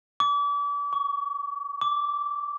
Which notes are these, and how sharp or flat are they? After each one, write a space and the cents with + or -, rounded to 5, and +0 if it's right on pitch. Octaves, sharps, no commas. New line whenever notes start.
D6 -35
C#6 +30
D6 -10